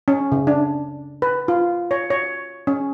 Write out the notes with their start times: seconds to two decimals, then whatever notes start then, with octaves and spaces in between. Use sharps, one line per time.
0.08 C#4
0.32 C#3
0.47 D4
1.22 B4
1.48 F4
1.91 C#5
2.10 C#5
2.67 C#4